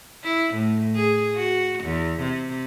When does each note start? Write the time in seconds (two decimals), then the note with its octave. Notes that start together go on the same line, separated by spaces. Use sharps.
0.23 E4
0.54 A2
0.96 G#4
1.36 F#4
1.84 E2
2.21 C3